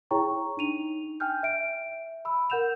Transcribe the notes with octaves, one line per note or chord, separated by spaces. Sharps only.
E4 G#4 C#5 G5 A#5 C#6
D4 D#4 D#7 F7
G5 G#5 F6 G6
E5 D7
B5 E6
A#4 F#5 G6 E7 F7